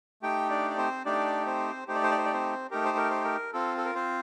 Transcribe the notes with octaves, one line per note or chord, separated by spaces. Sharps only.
A3 D#4 G4 G5
D4 D5
D5
C4 C5
A3 D4 D#4 G4 D5
C4 C5
A3 D#4 G4 C5
D5
C5
D5
C5
D5
C4 C5
A3 D#4 G4 A#4
C5
A#4
C5
A#4
C4 F4 A4
A4
A#4
C4 C5